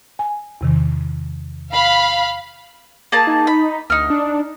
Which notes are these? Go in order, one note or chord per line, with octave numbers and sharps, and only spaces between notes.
G#5
E2 C3 D#3
F5 B5
A#3 G#4 A5
D#4
B5
D2 D#4 F6
D4